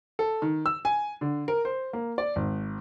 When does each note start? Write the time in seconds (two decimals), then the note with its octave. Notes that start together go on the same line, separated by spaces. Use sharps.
0.19 A4
0.42 D#3
0.66 E6
0.85 G#5
1.21 D3
1.48 A#4
1.65 C5
1.93 A#3
2.18 D5
2.36 G#1